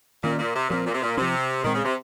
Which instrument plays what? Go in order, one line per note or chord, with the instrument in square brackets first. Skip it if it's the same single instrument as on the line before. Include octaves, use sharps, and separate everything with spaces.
[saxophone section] A#2 [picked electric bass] D#3 A#3 C#4
[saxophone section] A#2
C3
[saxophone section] A#2 [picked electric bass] F3 C4
[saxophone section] A#2
C3
A#2
[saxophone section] C3 [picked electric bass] F3 C4
[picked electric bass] A#2 G#3 C4 [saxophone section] D#3
[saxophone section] C#3
C3